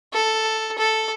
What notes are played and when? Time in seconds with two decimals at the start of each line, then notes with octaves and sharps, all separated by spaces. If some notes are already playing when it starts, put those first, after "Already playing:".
0.14 A4
0.78 A4